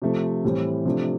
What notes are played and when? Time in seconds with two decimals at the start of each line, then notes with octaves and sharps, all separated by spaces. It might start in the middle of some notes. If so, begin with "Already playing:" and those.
0.02 C3 F3 A3
0.44 A2 E3 G3 C4
0.85 C3 F3 A3 D4